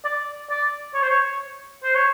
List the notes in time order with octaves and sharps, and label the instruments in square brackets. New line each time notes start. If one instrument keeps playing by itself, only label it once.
[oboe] D5
D5
C#5
C5
C#5
C5
C#5